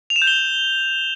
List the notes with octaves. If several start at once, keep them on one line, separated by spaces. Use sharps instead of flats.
F7
E7
G6
G7